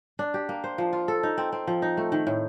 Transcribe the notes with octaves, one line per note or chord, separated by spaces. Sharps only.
D4
G4
A#3
C5
F3
F4
A4
D#4
C4
C4
F3
D#4
A3
D#3
A2